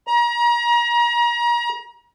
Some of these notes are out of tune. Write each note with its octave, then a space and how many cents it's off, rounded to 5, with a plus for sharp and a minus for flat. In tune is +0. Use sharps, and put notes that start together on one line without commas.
A#5 +35